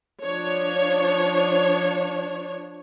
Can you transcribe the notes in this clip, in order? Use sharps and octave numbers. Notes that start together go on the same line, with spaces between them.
F3 D4 C#5